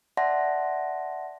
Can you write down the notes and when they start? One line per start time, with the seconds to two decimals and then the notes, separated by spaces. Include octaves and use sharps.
0.17 D5 E5 F#5 A5 C6 A#6